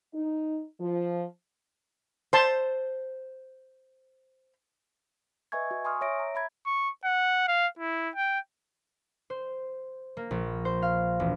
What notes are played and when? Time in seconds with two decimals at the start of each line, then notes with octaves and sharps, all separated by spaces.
0.13 D#4
0.80 F3
2.33 C5 A5 C6
5.52 B4 D#5 E5 G#5 C#6 G#6
5.71 F#4
5.85 G#5 C6 C#6 D#6 F6
6.01 C#5 E5 A#6 D7
6.19 A#5
6.35 E5 B5 G#6
6.66 C#6
7.04 F#5
7.48 F5
7.79 E4
8.15 G5
9.30 C5
10.17 A#3
10.31 A#1
10.65 C5
10.82 F5
11.20 E1